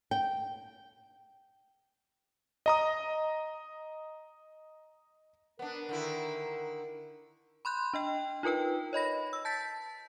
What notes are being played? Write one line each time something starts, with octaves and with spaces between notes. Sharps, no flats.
G5
D#5 A#5 D#6
B3 D4 A#4
D3 D#3 E4
B5 C6 F#6 G6
D4 D#5 G5
D#4 F4 A#4 B4 G5
C#5 D#5 B5 A#6
E6
A5 G6 A6 B6